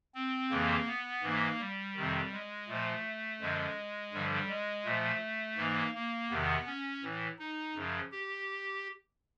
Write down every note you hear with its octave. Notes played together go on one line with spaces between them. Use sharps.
C4
F2 C#3 E3 A#3
B3
G#2 E3 A#3
G3
F2 C3 D#3
G#3
A#2 F3 A3
F#2 D3 F3 G#3
G2 D3 F3 G3
G#3
A#2 F3 A3
G#2 E3 A#3
A#3
E2 C3 D#3 B3
C#4
A2 E3
D#4
F#2 C#3 F3
G4